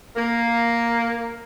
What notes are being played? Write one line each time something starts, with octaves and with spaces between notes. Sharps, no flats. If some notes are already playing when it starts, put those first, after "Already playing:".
A#3